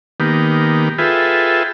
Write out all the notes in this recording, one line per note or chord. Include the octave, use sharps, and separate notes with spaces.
D#3 A#3 B3 G4
F4 G#4 A4 B4 E5 G5